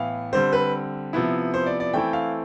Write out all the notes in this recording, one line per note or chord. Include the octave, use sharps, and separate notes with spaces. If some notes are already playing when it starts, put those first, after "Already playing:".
Already playing: A2 E3 B3 F5
D3 G3 C4 C5
B4
C3 F3 B3 E4
C5
D5
D5
E3 A3 C4 E4 G5
F5